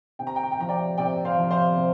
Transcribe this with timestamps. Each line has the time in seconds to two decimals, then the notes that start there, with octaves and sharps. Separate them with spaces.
0.19 C3 G5
0.27 A#5
0.36 G5
0.43 A#5
0.52 G5
0.59 F3 A#5
0.69 D5 G5
0.98 C3 D5 G5
1.25 C5 F5
1.38 F3
1.51 C5 F5
1.76 C3